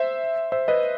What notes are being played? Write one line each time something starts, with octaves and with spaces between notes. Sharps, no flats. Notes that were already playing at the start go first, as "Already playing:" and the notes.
Already playing: C5 E5
C5 E5
B4 D#5